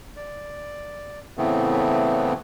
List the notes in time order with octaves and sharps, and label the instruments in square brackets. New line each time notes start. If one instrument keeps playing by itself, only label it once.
[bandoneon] D5
A2 C#3 E3 A3 B3 C4